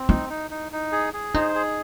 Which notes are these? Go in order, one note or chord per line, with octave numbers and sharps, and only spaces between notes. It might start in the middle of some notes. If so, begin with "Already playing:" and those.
Already playing: C4
D#4 E4
D#4
D#4
D#4
G#4
G#4
D#4 C5
G#4